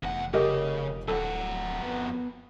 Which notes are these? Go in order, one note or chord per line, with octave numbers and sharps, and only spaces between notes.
F1 E2 F#5
C#3 G4 A#4 D#5
D1 F2 F#4 A4
B3